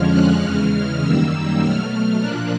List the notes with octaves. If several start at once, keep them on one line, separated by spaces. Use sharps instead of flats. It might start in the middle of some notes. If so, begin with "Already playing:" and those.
Already playing: F2 D3 F3 G#3 C#4 F6
F#6
E2 C#3 E3 G#3 F6
F#2 D#3 G3 A#3 E6
B2 F#3 A3 F6
A#2 F3 A#3 D4 F#6